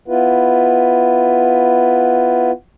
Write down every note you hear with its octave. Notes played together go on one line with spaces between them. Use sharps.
B3 E4 F4 B4